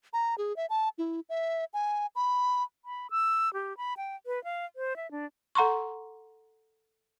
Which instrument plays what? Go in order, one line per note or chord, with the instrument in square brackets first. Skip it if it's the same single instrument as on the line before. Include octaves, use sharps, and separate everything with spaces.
[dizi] A#5
G#4
E5
A5
E4
E5
G#5
B5
[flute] B5
E6
G4
B5
G5
B4
F5
C5
E5
D4
[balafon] A4 F#5 A#5 C6 C#6